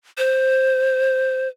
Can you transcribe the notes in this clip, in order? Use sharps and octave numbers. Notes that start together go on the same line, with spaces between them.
C5